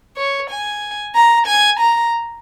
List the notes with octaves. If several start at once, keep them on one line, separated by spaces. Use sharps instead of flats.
C#5
G#5
A#5
G#5
A#5